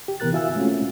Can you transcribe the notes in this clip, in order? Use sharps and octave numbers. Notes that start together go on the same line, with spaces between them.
G4
C3 E3 B3 A#4 F#6 A6
E4 F#4 E5 F5 G#5 E6
G#3 A3 C4 C#4 F4 F#4